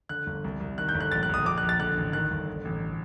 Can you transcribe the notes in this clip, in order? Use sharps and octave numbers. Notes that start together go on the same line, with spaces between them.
D3 F#6
G1
C2
C2
D#3 F#6
G6
G1
F#6
A#1 A6
F#6
A#1 D#6
A#1 D6
F#6
A#1
A6
D3 F#6
A1
D#3 F#6
G1
D3
A1